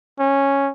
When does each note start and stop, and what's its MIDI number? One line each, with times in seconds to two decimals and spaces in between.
0.19 0.71 61